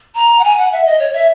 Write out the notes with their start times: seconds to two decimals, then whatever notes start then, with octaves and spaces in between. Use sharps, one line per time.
0.15 A#5
0.39 F#5
0.44 G#5
0.58 F#5
0.72 E5
0.85 D#5
0.99 C#5
1.13 E5